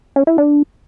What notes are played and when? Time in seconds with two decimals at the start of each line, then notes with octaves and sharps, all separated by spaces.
0.16 C#4
0.27 E4
0.38 D4